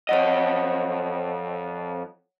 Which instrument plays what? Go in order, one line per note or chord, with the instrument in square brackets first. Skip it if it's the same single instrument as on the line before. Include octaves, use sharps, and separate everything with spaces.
[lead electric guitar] F2 D#5 [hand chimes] C#5 F#5